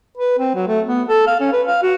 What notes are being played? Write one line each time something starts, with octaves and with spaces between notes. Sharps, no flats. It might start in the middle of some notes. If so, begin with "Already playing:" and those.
B4
C4
F#3
A3
B3
A4
F5
C#4
B4
F5
F#4